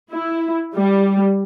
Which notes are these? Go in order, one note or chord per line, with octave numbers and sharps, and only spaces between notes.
E4
G3